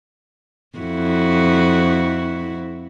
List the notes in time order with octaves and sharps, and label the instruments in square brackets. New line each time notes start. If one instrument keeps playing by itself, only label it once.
[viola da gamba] F2 E4 F#4